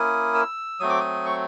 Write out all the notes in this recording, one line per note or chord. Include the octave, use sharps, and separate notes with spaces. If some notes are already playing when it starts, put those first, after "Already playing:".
Already playing: A#3 C#4 E4 D#6
E6
F#3 A3 C4 D#6
D6
D#6
C#6